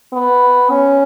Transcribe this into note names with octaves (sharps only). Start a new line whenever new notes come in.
B3
C#4